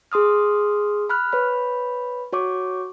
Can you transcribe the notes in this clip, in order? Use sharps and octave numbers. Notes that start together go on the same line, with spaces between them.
G#4 C6 D#6 F6
B5 F6 F#6
B4 C#5 B5
F#4 C#5 C#6 D6